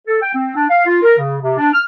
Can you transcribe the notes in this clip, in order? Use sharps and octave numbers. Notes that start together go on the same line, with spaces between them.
A4
G5
C4
D4
F5
F4
A#4
C#3
C3
D4
F6